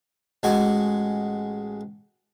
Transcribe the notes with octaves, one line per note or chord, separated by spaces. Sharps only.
A1 G#3 F#4 G#5 C#6